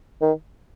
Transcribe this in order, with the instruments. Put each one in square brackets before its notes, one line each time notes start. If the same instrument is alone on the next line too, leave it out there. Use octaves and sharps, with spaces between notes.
[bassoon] D#3